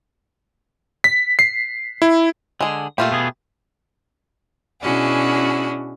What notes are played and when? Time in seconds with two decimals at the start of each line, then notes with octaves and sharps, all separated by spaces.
1.04 B6
1.39 C7
2.02 E4
2.61 D3 G#3 G#4
2.98 A#2 A3 F4 G4
3.11 B2 B3 G#4
4.81 B2 C#4 D4 E4 F#4 G#4